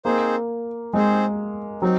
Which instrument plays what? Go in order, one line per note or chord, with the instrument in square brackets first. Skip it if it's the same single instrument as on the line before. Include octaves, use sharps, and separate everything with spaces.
[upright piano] A#3 [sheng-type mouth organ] C4 D#4 G#4 C5
[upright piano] G#3 [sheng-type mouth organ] C4 D#4 G#4 C5
[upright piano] F#3 [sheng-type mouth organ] C4 D#4